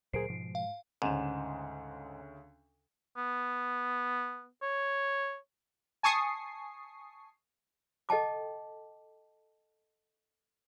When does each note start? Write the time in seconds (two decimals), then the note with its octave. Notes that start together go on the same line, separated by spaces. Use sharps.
0.13 D2 A#2 F#3 G#4 A#4 C5 C7 D7
0.30 G#2 B2 F3 G#3
0.55 F5
1.02 D2 G#2 C#3 E7
3.17 B3
4.63 C#5
6.03 G#5 A5 C#6 D#6 C7
8.09 A4 D#5 G5 A5 D6